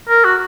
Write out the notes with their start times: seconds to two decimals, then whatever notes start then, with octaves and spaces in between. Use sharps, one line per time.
0.09 A#4
0.24 F#4